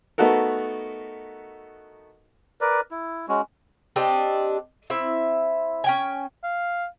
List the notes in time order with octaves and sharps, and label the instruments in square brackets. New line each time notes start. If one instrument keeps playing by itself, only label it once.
[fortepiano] A3 B3 D#4 F#4 A4 A#4
[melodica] A#4 B4 D5
E4
G#3 C#4 F#4
[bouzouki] C4 D4 G4 D#5
C4 E4 E5
C#4 G5 G#5
[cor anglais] F5